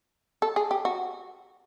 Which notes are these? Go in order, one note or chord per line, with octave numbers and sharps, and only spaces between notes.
A4
G#4
G4
F#4